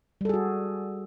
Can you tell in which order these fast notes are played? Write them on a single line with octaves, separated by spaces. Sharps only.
G3 A4 G#4 F#4